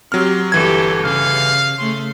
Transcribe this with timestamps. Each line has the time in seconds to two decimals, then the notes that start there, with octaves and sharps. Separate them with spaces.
0.12 F#3 C4 G4 F6
0.52 G1 E3 G4 A4 C#5 G#6
1.04 C#3 F5
1.79 C#3 A3 C6